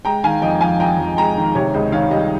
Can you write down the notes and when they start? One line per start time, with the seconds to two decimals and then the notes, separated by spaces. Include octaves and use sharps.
0.05 G#3 G5 A#5
0.24 D#3 F5 G#5
0.42 F2 D#5 G5
0.61 F2 F5 G#5
0.80 F2 G5 A#5
0.99 F2
1.17 G#3 G5 A#5
1.37 D#3
1.55 C3 C#5
1.74 C#2 D#5
1.92 D#3 C#5 F5
2.11 G3 D#5